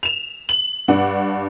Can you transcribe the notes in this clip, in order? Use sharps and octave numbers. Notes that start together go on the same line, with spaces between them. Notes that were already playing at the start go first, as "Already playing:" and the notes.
E7 F7
F#7
G2 D4 F#5